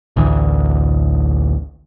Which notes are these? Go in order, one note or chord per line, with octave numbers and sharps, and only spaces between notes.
A1 D2 E3